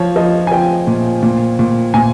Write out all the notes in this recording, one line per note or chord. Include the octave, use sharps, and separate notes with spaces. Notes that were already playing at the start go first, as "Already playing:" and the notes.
Already playing: F3 C#5
F3 D#5
G#5
F3 G5
A#2
A#2
A#2
A#2 G#5